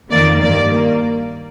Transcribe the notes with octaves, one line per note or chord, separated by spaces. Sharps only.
F2 D#3 A#3 D5
G2 D#3 A#3 D5
A#3